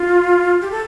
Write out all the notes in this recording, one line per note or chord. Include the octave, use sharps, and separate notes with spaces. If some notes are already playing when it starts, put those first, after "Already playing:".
Already playing: F4
G4
A4